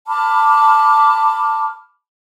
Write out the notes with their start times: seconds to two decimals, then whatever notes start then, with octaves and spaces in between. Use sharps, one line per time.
0.07 A5 B5 D6 F6